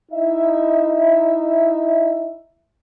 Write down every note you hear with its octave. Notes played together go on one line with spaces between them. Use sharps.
D#4 E4 E5